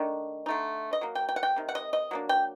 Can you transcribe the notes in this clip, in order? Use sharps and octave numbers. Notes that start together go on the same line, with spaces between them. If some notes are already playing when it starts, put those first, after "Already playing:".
Already playing: D#3 A3 D4
D3 A3 D#4
D#5
F#3 A#3
G5
G5
F#5
G5
C3 D#3
F#5
D#5
D#5
F#3 A#3 D4
G5